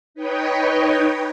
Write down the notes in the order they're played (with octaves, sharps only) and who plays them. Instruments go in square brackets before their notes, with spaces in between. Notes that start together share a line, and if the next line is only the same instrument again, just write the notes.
[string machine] D#4 B4 C#5 D#5 G5